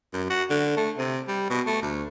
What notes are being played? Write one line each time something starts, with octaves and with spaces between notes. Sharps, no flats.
F#2
F#4
D3
A3
C3
G3
B2
A3
D2